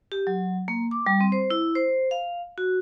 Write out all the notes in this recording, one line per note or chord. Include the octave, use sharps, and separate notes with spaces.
G4
F#3
A#3
D6
G3
C4
C5
E4
C5
F5
F#4